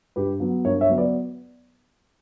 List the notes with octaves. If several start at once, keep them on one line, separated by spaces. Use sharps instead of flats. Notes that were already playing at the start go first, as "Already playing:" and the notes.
G2 G4 B4
F#3 B3
G2 A#4 C#5
C#5 E5
F#3 B3
B4 D5